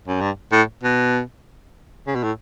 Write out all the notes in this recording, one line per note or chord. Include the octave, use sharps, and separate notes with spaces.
F#2
G2
A2
B2
C#3
B2
A2